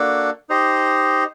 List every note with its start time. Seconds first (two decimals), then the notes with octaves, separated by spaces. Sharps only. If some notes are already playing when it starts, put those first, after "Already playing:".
Already playing: A#3 D4 F#4 A4
0.49 D#4 G4 C5 D#5